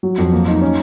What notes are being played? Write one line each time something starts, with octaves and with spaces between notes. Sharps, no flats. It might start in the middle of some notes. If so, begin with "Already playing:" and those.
F#3
F2
A#3
D#4
C#4